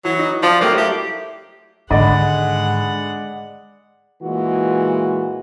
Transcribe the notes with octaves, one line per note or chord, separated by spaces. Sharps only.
E3 F#3
D#4
F3 D5 A5
F#3 A3 A#3 G4
E4 G4
G#2 D3 D#3 G#3 D5 D#5 F#5 B5
A#2 E3 G#3 F#4